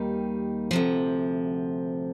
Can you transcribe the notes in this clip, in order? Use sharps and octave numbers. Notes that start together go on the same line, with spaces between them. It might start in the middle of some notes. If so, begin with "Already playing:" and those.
Already playing: D#2 D#3 G3 A#3 D#4
D2 C3 F3